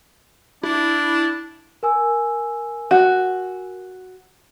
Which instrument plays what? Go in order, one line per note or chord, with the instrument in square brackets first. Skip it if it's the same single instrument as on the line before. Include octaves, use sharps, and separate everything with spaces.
[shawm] D4 [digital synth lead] E4
[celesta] A#4 G#5 E6
[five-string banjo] F#4